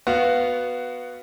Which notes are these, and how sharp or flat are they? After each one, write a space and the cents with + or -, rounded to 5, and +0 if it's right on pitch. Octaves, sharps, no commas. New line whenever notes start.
B3 +0 F#4 +0 F5 -15